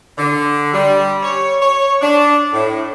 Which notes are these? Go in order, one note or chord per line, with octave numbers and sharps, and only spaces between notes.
D3
G3
C#5
C#5
D4
A2